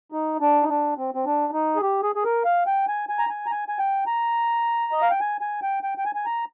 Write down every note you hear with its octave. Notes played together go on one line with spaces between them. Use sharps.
D#4
D4
D#4
D4
C4
C4
D4
D#4
G#4
G4
G#4
G#4
A#4
F5
G5
G#5
G#5
A#5
G#5
A#5
G#5
G#5
G5
A#5
D#5
F5
G5
G#5
G#5
G5
G5
G5
G#5
G#5
A#5